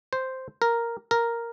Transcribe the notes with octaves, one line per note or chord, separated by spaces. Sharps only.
C5
A#4
A#4